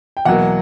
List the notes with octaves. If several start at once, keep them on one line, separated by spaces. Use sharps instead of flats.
G5
E2 B2 F#3 A#3 F#5